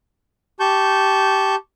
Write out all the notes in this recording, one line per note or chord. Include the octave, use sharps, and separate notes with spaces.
G4 A5 C#6 G6